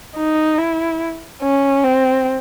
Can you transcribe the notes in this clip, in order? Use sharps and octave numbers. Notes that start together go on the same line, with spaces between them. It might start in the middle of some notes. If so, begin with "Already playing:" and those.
D#4
E4
C#4
C4